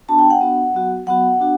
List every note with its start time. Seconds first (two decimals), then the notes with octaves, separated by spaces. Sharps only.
0.08 B3 D4 F#4 A5
0.19 G5
0.30 F#5
0.41 B3 D4 F#4
0.74 F#3 B3 F#4
1.06 F#3 B3 F#4 F#5
1.40 B3 D4 F#4